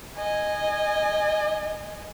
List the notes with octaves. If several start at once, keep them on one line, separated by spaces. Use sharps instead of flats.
D#5 G#5